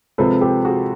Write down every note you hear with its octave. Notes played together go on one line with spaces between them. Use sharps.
C3 F3 G#3 C4 A4 B4
G4 A4
F#4 G#4